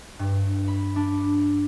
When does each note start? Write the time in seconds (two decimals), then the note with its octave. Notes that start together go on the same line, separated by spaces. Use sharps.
0.19 G2
0.68 B5
0.96 D4